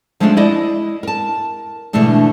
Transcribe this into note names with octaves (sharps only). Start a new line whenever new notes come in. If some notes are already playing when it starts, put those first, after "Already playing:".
F3 G#3 A3 C#4 D4 F4
E4 D5 D#5
A#4 A5
B2 D3 E3 G#3 A3 D4